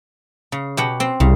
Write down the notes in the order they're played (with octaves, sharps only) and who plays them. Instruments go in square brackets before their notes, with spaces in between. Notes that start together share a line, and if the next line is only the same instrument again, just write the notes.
[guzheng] C#3
B2 G4 F#5
C4
[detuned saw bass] C2 [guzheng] C#3